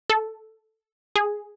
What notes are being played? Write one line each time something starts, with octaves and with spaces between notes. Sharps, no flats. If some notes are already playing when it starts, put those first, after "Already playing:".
A4
G#4